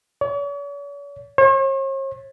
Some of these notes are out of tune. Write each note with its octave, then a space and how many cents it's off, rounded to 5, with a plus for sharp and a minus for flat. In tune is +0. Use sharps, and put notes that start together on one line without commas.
C#5 +45
C#5 -45